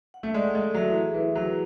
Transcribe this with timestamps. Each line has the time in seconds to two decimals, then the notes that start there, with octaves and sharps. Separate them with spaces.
0.14 F#5
0.23 A3
0.34 G#3 D5
0.55 G#3 A4
0.74 F#3 E5
0.88 E3
0.95 G#4
1.14 E3 B4
1.35 F#3 E4